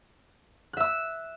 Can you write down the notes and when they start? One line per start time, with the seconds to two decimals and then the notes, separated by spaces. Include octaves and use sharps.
0.73 F#6
0.77 E5
0.80 E6